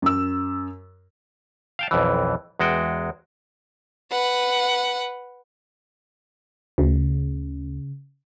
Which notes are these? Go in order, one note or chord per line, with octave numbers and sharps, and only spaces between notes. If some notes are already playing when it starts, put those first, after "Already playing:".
F#2 E6
F5 G5 A5
B1 F2 E3
E2 G#3 F#4 G5
B4 F#5
D2 C#3